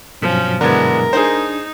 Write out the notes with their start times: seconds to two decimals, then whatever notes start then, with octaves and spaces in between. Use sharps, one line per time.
0.22 G2 B2 F3 F#3 C#4
0.61 D3 E3 G#3 B3 A#4 G#6
1.13 D4 D#4 G#4 C5